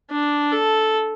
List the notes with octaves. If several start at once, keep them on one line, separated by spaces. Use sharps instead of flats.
D4
A4